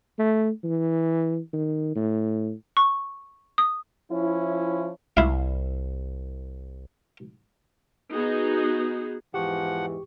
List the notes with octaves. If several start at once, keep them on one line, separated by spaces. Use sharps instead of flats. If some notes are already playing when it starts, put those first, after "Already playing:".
A3
E3
D#3
A2
C#6
D#6
F3 C#4 E4
C2 E4 F5
B3 D#4 F#4 G#4
E2 G#2 E3 F3 G4 F#5 C#6